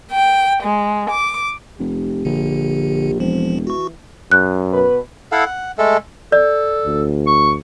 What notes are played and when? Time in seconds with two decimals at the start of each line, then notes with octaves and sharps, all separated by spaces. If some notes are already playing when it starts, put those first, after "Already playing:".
0.13 G5
0.63 G#3
1.10 D6
1.79 F1 G4
2.25 A#1 D3
3.20 E1 F3 C4
3.67 E3 F#4 C#6
4.32 F#2 F#6
4.73 B2 B4
5.32 E4 A4 F5 F#5
5.46 F#5
5.78 G#3 A3 A4
6.32 A4 D5
6.86 D2
7.27 C#6